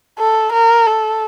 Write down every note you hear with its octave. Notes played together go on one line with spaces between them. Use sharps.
A4
A#4
A4